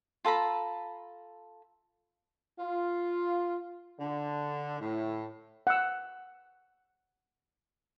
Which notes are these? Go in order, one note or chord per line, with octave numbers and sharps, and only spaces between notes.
F4 A4 A#5 B5
F4
D3
A2
F#5 E6